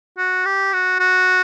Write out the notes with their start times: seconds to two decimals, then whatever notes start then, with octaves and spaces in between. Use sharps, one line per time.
0.17 F#4
0.45 G4
0.73 F#4
1.00 F#4